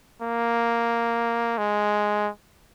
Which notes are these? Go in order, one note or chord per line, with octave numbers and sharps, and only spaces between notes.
A#3
G#3